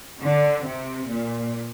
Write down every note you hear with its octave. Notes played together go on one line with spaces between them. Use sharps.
D3
C3
A#2